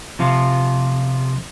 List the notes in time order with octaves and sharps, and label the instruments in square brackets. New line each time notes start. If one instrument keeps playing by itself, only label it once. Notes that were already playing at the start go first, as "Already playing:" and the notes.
[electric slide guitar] C3 F3 F4